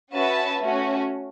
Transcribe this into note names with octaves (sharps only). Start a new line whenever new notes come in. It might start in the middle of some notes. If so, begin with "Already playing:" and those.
C#4 F#4 B4 E5 A5
A3 C#4 F#4